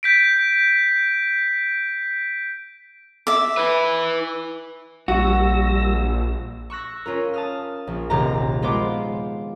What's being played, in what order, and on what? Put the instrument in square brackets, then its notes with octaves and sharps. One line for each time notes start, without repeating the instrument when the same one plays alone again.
[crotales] G6 B6 D7
[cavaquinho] E5 D6
[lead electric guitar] E4 B4
[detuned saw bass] A#1 [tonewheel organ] G3 E6 A#6 [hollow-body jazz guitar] F#4
[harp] C#6 E6 F#6 A#6
C#4 F4 A#4
A5 D#6 F6
A#1
D#1 A#1 C3 G4 A#5 A#6
G#3 B3 F4 C5 D6 D7